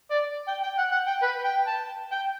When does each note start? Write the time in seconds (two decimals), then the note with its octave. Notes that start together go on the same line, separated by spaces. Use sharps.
0.11 D5
0.48 G5
0.63 G5
0.78 F#5
0.92 F#5
1.07 G5
1.22 B4
1.45 G5
1.67 A5
2.12 G5